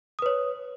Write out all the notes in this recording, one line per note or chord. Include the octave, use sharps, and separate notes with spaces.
B4 C#5 D#6